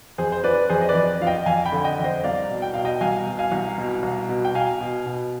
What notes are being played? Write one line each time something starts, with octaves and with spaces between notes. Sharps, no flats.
F2 G#4 C5
C5
F3 B4 D5
F2 G#4 C5
D#5
B4 D5
F2
F3 F5
D#5 G5
F2 F5 G#5
G5 B5
D3
D#5 G5
F2
C5 D#5
C2 D5 F5
B2
G5
B2 F5
D#5 G5
C2 F5 G#5
B2
F5 G#5
C2
B2
C2
B2
G5
B2 F5 G#5
B2
B2